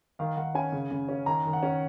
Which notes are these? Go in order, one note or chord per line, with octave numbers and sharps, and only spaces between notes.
D#3 F5
D#3 F#5
C#4 G#5
C#3
C#3
C#4
D#3 A#5
D#3
F#5
C#4